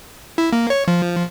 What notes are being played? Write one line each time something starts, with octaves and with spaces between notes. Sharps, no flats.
E4
A#3
C#5
F3